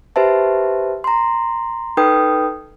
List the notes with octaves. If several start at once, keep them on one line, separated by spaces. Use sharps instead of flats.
G4 B4 C5 E5 A5
A#5 C6
D#4 A4 B4 G5 D#6